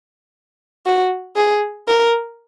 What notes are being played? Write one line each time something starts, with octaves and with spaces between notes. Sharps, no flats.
F#4
G#4
A#4